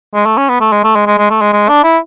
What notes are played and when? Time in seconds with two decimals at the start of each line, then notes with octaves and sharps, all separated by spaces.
0.14 G#3
0.25 A3
0.38 C#4
0.49 B3
0.60 A3
0.72 G#3
0.84 A3
0.96 G#3
1.07 G#3
1.18 G#3
1.30 A3
1.41 G#3
1.53 G#3
1.68 D4
1.84 E4